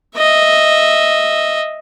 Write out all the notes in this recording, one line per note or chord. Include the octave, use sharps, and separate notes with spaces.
D#5 E5